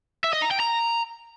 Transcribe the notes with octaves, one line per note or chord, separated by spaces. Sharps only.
E5
D#5
A#5
G5
A#5